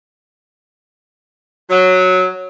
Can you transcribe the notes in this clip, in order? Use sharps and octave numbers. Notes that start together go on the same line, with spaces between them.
F#3